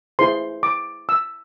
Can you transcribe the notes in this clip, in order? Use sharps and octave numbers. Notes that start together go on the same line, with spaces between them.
E4 G#4 C5 C6
D6
E6